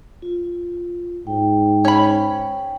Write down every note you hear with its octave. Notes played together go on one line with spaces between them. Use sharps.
F4
G#2 G5
C#4 B5